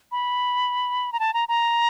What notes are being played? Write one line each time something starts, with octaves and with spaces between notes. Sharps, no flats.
B5
A#5
A5
A#5
A#5